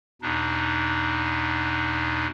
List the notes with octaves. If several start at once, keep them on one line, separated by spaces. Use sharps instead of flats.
E2 B2 D4 D#4